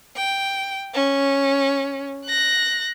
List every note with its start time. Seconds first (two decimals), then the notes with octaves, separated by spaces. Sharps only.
0.17 G5
0.94 C#4
2.26 F#6 A#6